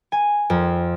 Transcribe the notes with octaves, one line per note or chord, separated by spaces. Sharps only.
G#5
F2